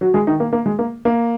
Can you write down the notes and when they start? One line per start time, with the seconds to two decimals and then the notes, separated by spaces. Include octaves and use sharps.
0.01 F#3 F#4
0.14 G#3 G#4
0.27 D#3 D#4
0.40 A#3
0.53 A#3
0.66 G#3
0.79 A#3
1.05 A#3